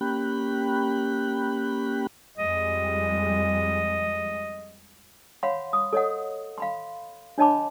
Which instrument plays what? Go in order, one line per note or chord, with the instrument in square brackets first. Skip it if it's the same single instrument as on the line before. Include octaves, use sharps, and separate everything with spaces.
[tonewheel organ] A#3 C#4 G4 G5 B5 F#6
[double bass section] F2 G3 G#3 [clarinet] D#5
[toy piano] C#5 F5 F#5 B5 C6
D#6
A4 C#5 D#5 F#5
F5 B5 C6
D4 C#5 D#5 A5 B5 D6